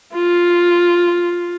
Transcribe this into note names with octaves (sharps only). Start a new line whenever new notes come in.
F4